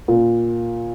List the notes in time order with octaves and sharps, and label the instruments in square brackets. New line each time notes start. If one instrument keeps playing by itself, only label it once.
[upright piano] A#2